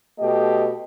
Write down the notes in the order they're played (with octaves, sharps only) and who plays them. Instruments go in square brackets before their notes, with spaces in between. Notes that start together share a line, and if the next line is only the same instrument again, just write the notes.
[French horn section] B2 A3 G4 D#5